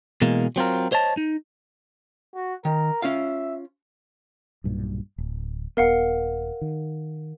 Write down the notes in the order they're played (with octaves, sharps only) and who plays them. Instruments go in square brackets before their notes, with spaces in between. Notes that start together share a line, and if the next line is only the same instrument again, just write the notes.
[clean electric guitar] B2 E3 G#3 A#3
F#3 C4 F4 A#4
C5 C#5 D#5 A5
D#4
[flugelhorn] F#4
[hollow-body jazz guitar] D#3 [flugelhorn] A#4
[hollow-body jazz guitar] C#4 F4 F5 [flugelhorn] E5
[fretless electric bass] B1 G2 A#2
D1
[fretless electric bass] D#1 B3 [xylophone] A#4 F5 F#5
[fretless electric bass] D#3